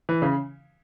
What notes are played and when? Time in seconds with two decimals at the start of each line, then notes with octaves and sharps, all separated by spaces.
0.09 E3
0.22 C#3